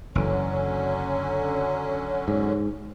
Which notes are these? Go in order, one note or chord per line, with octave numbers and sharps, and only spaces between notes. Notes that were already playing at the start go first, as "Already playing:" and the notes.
F#1 D3 E3 F#3 C#4
G#2